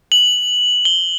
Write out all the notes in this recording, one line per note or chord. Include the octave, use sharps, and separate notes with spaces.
F#7
G7